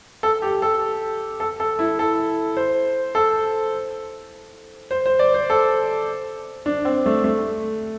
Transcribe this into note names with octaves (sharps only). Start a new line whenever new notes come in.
A4
G4
A4
A4
A4
E4
A4
C5
A4
C5
C5
D5
C5
A4
D4
C4
A3
A3